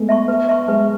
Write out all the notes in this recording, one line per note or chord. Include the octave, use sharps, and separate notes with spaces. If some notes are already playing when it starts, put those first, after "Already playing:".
Already playing: G#3 A3 B3
E5 A5 C#6
B4
E5 A5 C#6
G#3 B4